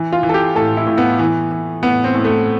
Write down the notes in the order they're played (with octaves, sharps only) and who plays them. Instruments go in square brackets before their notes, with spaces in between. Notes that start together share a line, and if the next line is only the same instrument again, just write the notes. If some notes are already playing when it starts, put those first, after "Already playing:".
Already playing: [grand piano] E3
F4
E3
A4
G4
A2 A4
E4
A2
B3
E3
E3
A2 B3
C4
A2
A3